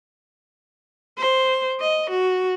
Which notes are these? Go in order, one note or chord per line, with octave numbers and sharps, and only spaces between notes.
C5
D#5
F#4